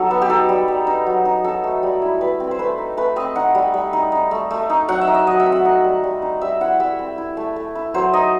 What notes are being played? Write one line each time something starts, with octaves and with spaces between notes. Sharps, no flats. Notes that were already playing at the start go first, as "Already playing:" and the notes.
Already playing: F#3 D#4 A4
B3
G4
D#4 A4
G3
G3
D#4
F#3
D#4
F#3 A4
A3
G3
E4
G3 B4
C4
C5
A3 B4
D#4
A3 B4
C4 D#5
D#4 F#5
G3
G3
D#4
D#4
A3
A3
D#4
F#3 F#5
E5
D#4
D#5
F#3 D#5
E5
C4
F#5
D#4 D#5
G3
G3
D#4
G3 E5
E4 F#5
G3 E5
C4
E4
A3
A3
E4
F#3 C5
D#4 D#5